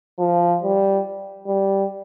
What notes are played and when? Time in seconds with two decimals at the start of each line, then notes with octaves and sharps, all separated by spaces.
0.19 F3
0.62 G3
1.47 G3